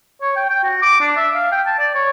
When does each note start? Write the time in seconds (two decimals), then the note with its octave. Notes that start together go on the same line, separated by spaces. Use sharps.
0.22 C#5
0.36 G5
0.49 G5
0.64 F#4
0.82 D6
1.01 D4
1.17 E5
1.35 F5
1.52 G5
1.67 A5
1.79 D5
1.95 C#5